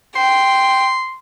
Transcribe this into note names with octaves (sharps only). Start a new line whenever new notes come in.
G5 C6